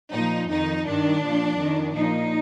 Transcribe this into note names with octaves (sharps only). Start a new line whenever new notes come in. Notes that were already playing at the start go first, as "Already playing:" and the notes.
A#2 F3 D#4
F2 D#3 D#4
G2 D#3 D4
A#2 F3
F2 D#3
A#2 F3 D#4